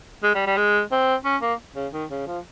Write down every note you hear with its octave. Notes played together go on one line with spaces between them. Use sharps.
G#3
G3
G3
G#3
C4
C#4
A#3
C#3
D#3
C#3
F3